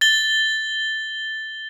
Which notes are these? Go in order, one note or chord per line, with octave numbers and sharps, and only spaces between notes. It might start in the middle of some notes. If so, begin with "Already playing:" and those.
A6 G7